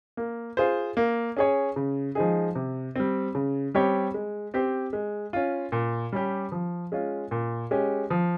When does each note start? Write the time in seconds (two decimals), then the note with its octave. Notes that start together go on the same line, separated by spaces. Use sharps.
0.17 A#3
0.57 F4 G#4 C5
0.97 A#3
1.37 C#4 G#4 C#5
1.76 C#3
2.15 F3 G#3 D#4 G#4
2.55 C3
2.96 G3 C4
3.35 C#3
3.74 G3 C4 G4 C#5
4.14 G#3
4.54 C4 G4 C5
4.93 G#3
5.33 C#4 F4
5.72 A#2
6.13 G3 C#4 G4
6.52 F3
6.92 G#3 C#4 F4
7.31 A#2
7.71 G#3 C#4 G4
8.10 F3